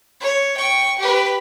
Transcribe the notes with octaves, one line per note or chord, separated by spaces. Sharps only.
C#5
G5 C#6
G4 B4